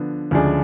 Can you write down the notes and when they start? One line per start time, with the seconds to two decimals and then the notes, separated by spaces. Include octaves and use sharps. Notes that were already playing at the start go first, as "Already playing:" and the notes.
Already playing: D3 F3 B3
0.31 D2 C#3 F3 G#3 D4